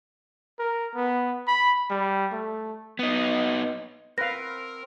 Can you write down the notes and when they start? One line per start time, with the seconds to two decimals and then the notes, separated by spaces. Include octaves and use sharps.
0.59 A#4
0.95 B3
1.47 B5
1.90 G3
2.32 A3
2.99 B3 D#4
4.18 C4 A#4 B4 F5 A#6